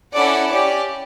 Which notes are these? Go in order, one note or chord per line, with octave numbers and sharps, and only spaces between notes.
C#4 E4 A4 D5 F#5
C#4 G4 D5